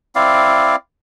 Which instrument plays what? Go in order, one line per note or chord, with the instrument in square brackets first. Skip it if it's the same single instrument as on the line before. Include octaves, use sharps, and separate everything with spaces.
[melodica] C4 E4 D5 F5